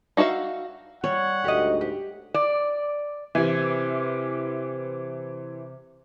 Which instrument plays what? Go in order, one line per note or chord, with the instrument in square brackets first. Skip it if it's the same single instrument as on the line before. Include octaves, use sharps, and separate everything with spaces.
[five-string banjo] D#4 F#4 G#4 E5 F5
[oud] G3 [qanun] C#5 [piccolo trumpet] F#5
[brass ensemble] D2 G#2 [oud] G4 D#5
[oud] G4
[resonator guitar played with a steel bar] D5
[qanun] C3 G#5 [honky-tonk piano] E3